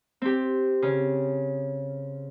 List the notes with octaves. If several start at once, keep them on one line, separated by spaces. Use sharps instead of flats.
C4 G4
C#3